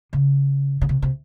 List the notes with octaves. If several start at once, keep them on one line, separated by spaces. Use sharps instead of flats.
C#3
C#3
C3
C3